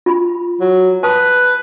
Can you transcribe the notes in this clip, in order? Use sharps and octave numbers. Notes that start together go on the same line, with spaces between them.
F4 B5
F#3
B4 A5 D#6